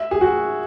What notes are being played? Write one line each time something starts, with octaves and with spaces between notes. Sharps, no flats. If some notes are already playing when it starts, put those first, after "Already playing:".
Already playing: E5
G#4
F#4